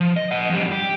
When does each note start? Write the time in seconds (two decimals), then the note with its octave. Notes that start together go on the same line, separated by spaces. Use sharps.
0.01 F3
0.17 D#5
0.31 D#5 F#5
0.50 F2 G3
0.72 G4